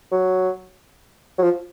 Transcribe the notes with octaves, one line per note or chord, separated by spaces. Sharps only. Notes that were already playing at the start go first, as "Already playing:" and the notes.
F#3
F#3
F3